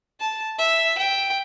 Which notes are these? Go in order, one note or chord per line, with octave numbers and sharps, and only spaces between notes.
A5
E5
G5